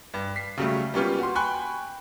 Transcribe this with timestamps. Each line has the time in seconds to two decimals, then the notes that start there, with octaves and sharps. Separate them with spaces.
0.14 G2
0.36 B6 C7
0.58 C#3 F#3 G3 A3
0.94 G3 A#3 B3 C#4 F4 G4
1.19 F#4 C6
1.35 G5 G#5 B5 C#6 F#6